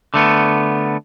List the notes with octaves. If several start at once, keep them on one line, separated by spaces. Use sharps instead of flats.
D3 A3 B3